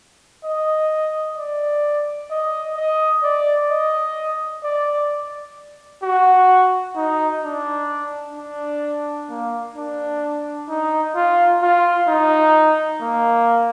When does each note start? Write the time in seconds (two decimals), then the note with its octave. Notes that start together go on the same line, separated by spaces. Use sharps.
0.45 D#5
1.38 D5
2.31 D#5
2.77 D#5
3.23 D5
3.71 D#5
4.64 D5
6.03 F#4
6.96 D#4
7.43 D4
8.36 D4
9.30 A#3
9.76 D4
10.69 D#4
11.16 F4
11.62 F4
12.08 D#4
13.02 A#3